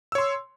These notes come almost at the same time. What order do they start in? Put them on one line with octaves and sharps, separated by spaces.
E6 C#5 C6